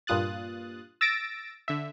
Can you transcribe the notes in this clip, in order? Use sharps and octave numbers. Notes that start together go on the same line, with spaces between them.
G2 A#2 F4 D#6 F#6 A6
E6 A6 A#6 D7
D3 E5